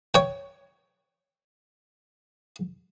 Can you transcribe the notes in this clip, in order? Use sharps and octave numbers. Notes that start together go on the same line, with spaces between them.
C#5 G5